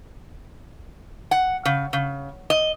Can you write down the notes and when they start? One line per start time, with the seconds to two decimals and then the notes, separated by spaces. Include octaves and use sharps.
1.31 F#5
1.65 C#3
1.93 C#3
2.50 D#5